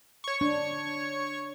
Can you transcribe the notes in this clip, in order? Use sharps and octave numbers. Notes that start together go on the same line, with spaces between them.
C#5 C#6
D4